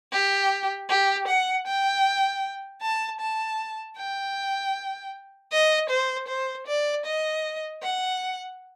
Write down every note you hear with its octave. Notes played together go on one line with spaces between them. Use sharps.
G4
G4
F#5
G5
A5
A5
G5
D#5
C5
C5
D5
D#5
F#5